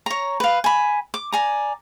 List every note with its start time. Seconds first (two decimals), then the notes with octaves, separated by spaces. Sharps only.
0.06 C#5 A#5
0.40 B4 F5
0.64 G#5 B5
1.14 D6
1.32 D5 G#5 A#5